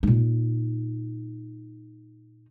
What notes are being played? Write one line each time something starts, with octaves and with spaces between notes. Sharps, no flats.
A#2 D#4